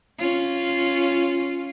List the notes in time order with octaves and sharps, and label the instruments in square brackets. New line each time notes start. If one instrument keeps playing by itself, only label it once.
[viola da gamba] C#4 F4